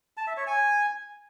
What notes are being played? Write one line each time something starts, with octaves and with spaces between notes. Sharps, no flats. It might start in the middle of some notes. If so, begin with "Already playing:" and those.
A5
E5
C#5
G#5